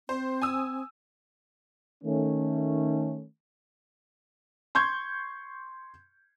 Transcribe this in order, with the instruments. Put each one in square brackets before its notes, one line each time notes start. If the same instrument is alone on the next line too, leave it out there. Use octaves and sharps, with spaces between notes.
[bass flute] C4 [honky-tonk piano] C5
[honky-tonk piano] G#5 D#6 E6
[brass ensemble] D#3 A3 C#4
[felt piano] C6 C#6 G6 G#6